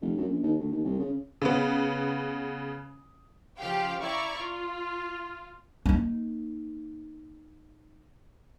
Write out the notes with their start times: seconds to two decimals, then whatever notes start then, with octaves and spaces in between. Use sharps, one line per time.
0.02 F1
0.18 F#2
0.29 A#1
0.43 D#2
0.59 D2
0.72 D#2
0.84 C2
1.00 C#3
1.42 C#3 B3
3.58 C#3 F3 G4 F5 G5
4.00 E4 D5 A#5 C#6
4.37 F4
5.86 A#3 D#4